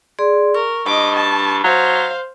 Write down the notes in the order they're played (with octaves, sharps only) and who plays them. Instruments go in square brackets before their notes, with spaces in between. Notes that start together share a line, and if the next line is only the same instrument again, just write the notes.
[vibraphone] G#4 D5 C6
[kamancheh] A#4 [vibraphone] C#6
[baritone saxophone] G2 [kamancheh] D#5 D6
[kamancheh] A5
[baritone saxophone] F#3 [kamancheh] C5 F5